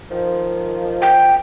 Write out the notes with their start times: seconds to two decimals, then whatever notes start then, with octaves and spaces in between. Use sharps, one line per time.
0.11 D#3 F3
1.02 G5